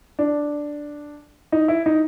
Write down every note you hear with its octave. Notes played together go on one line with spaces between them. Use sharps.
D4
D#4
E4
D#4